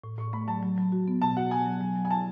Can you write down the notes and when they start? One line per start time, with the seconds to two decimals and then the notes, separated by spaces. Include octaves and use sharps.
0.04 A2
0.18 A2 C#6
0.33 A3 B5
0.48 F#3 A5
0.63 F#3
0.78 F#3
0.92 F#4
1.08 B3
1.22 B2 A5
1.37 F#4 F#5
1.51 B3 G#5
1.66 F#3
1.81 F#3
1.96 F#3
2.05 G#5
2.10 E4 A5